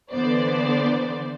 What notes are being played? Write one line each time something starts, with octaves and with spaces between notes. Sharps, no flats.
D3 E3 B3 C5 D5